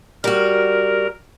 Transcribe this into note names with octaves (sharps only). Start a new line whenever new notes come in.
G3 F#4 A#4